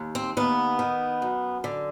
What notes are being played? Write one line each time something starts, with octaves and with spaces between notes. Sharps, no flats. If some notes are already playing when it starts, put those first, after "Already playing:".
Already playing: D#2
C4
D#2 B3
D#3
F#2
D3